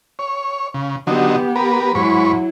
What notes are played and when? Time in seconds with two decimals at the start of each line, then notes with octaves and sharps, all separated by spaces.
0.19 C#5
0.74 C#3
1.07 D3 F#3 B3 D#4 G4
1.56 A#4 B4
1.95 G#2 F#3 E4 B5 C#6